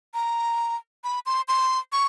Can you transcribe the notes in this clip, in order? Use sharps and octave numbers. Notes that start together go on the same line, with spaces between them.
A#5
B5
C6
C6
C#6